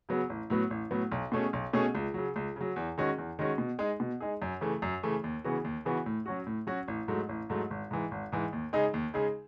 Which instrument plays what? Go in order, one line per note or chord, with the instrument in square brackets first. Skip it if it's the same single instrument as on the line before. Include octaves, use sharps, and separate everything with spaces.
[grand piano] C#3 F#3 B3
A1
A2 F#3 B3
A1
A2 F#3 B3
B1
B2 A3 C#4 G#4
B1
B2 A3 C#4 G#4
C#2
C#3 F#3
C#2
C#3 F#3
E2
D#3 G#3 C#4 F#4
E2
D#3 G#3 C#4 F#4
B2
G#3 D#4 G#4
B2
G#3 D#4 G#4
F#2
C#3 E3 A3
F#2
C#3 E3 A3
D#2
C#3 E3 B3 F#4
D#2
C#3 E3 B3 F#4
A2
F#3 C#4 F#4
A2
F#3 C#4 F#4
A1
G#2 F#3 A3
A1
G#2 F#3 A3
G#1
G#2 E3
G#1
G#2 E3
D#2
C#3 G#3 D#4 G#4
D#2
C#3 G#3 D#4 G#4